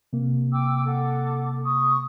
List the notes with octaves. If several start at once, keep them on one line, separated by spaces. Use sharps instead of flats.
C3 A#3
G5 D6 E6
A4 F#5 D6
C#6 D#6